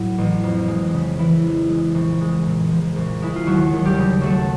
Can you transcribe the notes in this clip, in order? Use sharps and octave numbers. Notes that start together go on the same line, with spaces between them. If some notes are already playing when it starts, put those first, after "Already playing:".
Already playing: A2 F#3
A1
F2
G#3
C#3
E3 E4
F2
G#3
A#1
G#3
A#2
F3
A#1
G#3 E4
F4
D#2 F#3 F#4
D#2
G3 G4
C#3
F#3 A3 A4